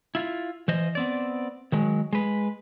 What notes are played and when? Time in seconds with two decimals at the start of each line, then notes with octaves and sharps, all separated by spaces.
0.15 E4 F4
0.68 E3 C5 D#5
0.95 B3 C4 D5
1.72 D#3 F#3 G#3
2.13 G#3 B4